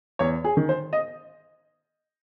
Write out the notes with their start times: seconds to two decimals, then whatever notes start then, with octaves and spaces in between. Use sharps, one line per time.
0.19 E2 C#5
0.44 G#4
0.57 D#3
0.69 C5
0.93 D#5